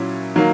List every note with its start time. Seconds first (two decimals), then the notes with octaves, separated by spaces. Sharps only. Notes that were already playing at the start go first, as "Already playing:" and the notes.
Already playing: A#2 F#3 C#4 E4
0.36 D#3 F#3 A#3